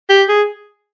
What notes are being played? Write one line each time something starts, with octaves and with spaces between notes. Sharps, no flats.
G4
G#4